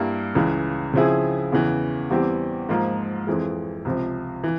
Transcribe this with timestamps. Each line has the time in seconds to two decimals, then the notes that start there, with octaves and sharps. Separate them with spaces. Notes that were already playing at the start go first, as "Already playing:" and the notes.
Already playing: G2 G3 A#3 E4
0.35 C#2 C#3 E3
0.93 C#3 F3 C4 E4 G#4
1.52 E2 C#3 E3
2.10 E2 E3 G3 C4 G4
2.69 G#2 F3 A#3 F4
3.27 F2 E3 G#3
3.85 C#2 C3 F3
4.44 E3